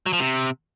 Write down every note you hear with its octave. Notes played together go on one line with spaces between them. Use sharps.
F#3
F3
C3